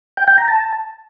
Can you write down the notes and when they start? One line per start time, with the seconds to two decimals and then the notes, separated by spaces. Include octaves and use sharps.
0.17 G5
0.28 G5
0.38 A#5
0.48 A5